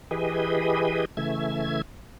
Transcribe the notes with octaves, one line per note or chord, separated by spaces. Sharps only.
E3 G4 G#4 B4 D#5
C#3 E3 A3 E5 G#6